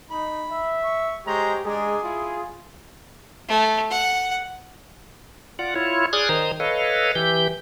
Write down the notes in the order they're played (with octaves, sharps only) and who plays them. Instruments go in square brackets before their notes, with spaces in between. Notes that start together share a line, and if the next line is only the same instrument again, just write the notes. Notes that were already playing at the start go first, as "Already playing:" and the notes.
[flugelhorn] D#4 [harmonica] B5
[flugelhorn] E5
[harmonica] C#6
[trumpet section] G#3 A#5 [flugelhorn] G4 [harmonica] C5 C#5
[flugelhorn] G#3 [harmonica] D4 A#5 [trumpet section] G#4
[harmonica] E4 [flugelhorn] F4
[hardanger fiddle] A3
F#5
[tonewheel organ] F4 D5 F#5
E4 F4 C#5
G#4 D5 D#6 F6 F#6 G#6
D#3 C5 A#5 D#6
A4 B4 C#5 D#5 F5
E3 G4 G6